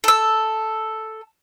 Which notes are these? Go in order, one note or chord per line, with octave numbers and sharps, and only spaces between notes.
A4 E6